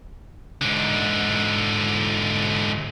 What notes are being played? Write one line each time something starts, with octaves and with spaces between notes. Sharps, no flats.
G#2 D3